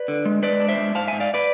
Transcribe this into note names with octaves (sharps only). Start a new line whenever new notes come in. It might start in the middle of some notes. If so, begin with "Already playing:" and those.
Already playing: B4 D5
D3
G#3
G#3 B4 D5
D4
C5 E5
G#3
G#2 F5 A5
G#2 E5 G#5
D5 F5
B4 D5